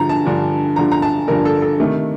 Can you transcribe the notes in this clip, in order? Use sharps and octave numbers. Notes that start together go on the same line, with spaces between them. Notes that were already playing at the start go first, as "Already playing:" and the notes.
Already playing: G2 D3 F3 A#5
A5
G2 D3 F3
G2 D3 F3 A#5
A#5
A5
G2 D3 F3 A#4
A4
A4
C3 D#3 A3